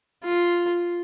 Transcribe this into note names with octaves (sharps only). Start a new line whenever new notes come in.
F4